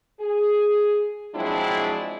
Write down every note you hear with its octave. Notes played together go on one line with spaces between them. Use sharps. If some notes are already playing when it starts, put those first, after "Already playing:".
G#4
F3 F#3 G#3 C4 D4 E4